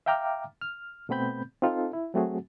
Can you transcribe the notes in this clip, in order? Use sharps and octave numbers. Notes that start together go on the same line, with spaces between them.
E5 F5 G5 A#5 D6 F6
F6
B2 A3 B3 C4 B5 G6
C4 D#4 F4 A4
E4
F#3 A3 C4 F#4 G#4